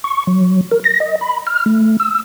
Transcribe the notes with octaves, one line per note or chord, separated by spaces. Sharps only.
C#6
F#3
A#4
A#6
D#5
B5
F6
A3
E6